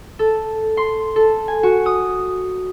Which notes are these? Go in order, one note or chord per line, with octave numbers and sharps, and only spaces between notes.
A4
C6
A4
G#5
F#4
D#6